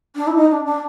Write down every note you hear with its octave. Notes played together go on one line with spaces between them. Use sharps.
D4
E4
D#4
D4
D4